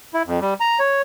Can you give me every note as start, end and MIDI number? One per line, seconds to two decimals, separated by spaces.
0.14 0.23 64
0.27 0.40 41
0.41 0.54 55
0.60 0.79 82
0.80 1.02 73